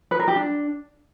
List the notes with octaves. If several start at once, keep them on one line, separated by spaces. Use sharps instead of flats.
B4
A#4
G4
D4